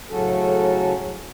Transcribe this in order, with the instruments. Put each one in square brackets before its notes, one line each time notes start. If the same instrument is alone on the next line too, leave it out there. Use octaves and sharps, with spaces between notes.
[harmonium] A2 C#3 F#3 C#4 F#4 A4